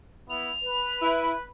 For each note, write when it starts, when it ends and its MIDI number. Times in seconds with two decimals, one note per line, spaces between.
0.30 0.52 59
0.30 0.52 64
0.30 1.10 101
0.63 1.49 71
1.01 1.32 64